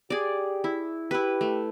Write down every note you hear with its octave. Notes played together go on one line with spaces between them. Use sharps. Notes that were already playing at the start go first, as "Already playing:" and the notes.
G4 G#4 D5
E4
E4 G4 B4
A3